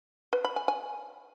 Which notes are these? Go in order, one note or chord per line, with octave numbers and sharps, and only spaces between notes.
B4
B5
G#5
G#5